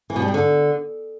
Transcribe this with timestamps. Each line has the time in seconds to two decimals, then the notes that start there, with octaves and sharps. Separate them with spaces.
0.10 E3
0.16 B2
0.22 G3
0.28 B2
0.34 D3